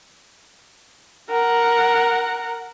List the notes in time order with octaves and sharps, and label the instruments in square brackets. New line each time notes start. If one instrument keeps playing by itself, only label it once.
[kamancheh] A#4 F#5